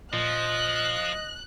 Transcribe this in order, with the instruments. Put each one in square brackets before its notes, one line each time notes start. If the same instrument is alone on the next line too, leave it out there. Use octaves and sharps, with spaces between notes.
[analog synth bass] A#2 [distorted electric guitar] F3 [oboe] D#5 [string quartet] F#6